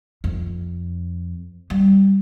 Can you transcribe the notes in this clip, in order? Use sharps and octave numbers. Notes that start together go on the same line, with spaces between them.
F2
G3